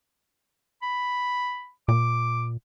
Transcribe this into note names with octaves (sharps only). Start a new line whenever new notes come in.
B5
A#2 D6